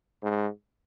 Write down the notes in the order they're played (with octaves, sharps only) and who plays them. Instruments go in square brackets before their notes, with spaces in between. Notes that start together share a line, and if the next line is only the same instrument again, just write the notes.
[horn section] G#2